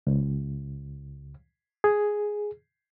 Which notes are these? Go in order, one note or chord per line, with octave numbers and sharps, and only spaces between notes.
C#2
G#4